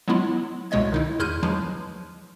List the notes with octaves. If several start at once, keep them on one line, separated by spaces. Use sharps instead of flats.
F#3 G#3 B3 E4 F4
C2 B2 G#3 C#5 D#5 G#6
D#3 D#4 E4
E2 E4 C6 F6 G6 D#7
F3 F#3 G#3 B4